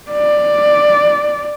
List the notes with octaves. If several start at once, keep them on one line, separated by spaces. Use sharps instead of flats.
D5